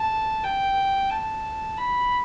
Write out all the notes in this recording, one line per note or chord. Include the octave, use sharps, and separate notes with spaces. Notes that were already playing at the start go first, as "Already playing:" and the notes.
Already playing: A5
G5
A5
B5